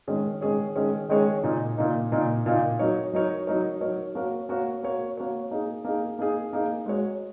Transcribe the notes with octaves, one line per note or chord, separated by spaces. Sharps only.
D#3 G#3 C#4 G#4 C#5
D#3 G#3 C#4 G#4 C#5
D#3 G#3 C#4 G#4 C#5
D#3 G#3 C#4 G#4 C#5
A#2 A#3 D#4
A#2 A#3 D#4
A#2 A#3 D#4
A#2 A#3 D#4
F#3 D#4 A#4 C#5
F#3 D#4 A#4 C#5
F#3 D#4 A#4 C#5
F#3 D#4 A#4 C#5
A#3 F#4 A#4 C#5
A#3 F#4 A#4 C#5
A#3 F#4 A#4 C#5
A#3 F#4 A#4 C#5
A#3 D#4 G#4
A#3 D#4 G#4
A#3 D#4 G#4
A#3 D#4 G#4
G#3 F#4 C#5